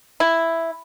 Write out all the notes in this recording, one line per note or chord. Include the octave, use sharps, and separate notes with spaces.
E4